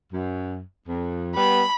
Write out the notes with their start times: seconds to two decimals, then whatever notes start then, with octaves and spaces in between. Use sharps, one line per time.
0.13 F#2
0.88 F2
1.36 G3 B3 B5